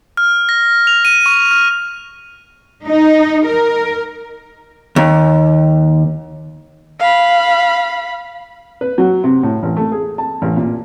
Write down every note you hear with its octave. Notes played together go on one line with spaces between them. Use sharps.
F6
A#6
F7
D#7
C#6
F6
D#4
A#4
D#2
F5 B5
B4
F#3
C3
A2
A1
A3
G#4
A5
A1
A#2